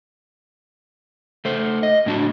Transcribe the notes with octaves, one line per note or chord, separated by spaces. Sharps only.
A3 C5
D#5
A2 D4 F#4